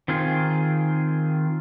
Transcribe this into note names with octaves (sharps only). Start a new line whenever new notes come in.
D#3 C4 F4 G#4